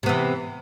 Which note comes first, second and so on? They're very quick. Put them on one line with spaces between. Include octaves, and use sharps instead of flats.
C3 B3 E3